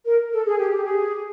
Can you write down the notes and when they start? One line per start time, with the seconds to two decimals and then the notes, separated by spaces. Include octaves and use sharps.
0.05 A#4
0.32 A4
0.45 G#4
0.58 G4
0.71 G4
0.84 G#4